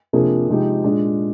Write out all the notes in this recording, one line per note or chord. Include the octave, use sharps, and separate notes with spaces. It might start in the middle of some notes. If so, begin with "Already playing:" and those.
C3 F3 A#3 D4 G#4
C3 F3 G#3 D#4 G4
A#2 G#3 D4